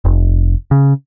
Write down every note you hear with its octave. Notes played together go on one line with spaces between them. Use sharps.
F1
C#3